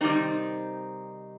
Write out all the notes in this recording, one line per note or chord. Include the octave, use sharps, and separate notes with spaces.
C3 D#3 G3 C4 D#4